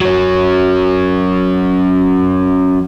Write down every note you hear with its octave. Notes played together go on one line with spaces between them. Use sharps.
F#3 C#4